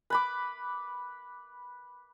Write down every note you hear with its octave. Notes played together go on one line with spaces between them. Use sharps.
B4 B5 D6